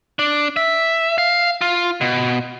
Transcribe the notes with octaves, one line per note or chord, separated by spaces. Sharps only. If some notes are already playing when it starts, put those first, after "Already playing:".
D4
E5
F5
F4
B2